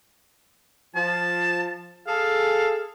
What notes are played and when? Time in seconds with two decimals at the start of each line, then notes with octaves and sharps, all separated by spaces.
0.96 F3 A5
2.07 G#4 A4 F5